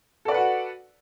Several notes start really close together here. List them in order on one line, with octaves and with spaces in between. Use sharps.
A4 D5 B4 F#5 F#4